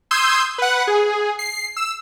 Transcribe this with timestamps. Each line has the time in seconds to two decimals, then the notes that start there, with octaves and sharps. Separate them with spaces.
0.11 C6 D#6 E6 G6 G#6
0.58 B4 F#5
0.87 G#4
1.39 C7
1.77 E6